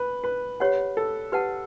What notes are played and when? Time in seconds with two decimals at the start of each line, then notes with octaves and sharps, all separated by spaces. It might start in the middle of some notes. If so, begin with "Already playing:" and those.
Already playing: B4
0.24 B4
0.60 G4 B4 C#5 F#5
0.97 A4
1.32 G4 B4 F#5 A5